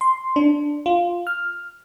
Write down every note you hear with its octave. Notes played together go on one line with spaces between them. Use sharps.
C6
D4
F4
F6